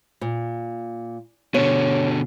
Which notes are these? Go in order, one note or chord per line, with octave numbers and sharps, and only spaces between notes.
A#2
B2 D3 C#5